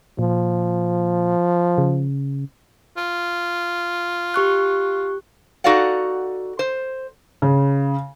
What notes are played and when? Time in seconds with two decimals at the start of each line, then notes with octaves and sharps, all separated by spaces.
0.19 A#2 F3
1.78 C#3
2.97 F4
4.34 G4 C#6 F#6
5.64 D#4 F#4 A4 D5 F5 F#5
6.59 C5
7.42 C#3